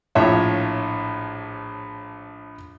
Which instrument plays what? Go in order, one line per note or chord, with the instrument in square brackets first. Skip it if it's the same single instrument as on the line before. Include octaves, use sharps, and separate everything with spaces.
[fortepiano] A#1 A2 F4 C#5 E5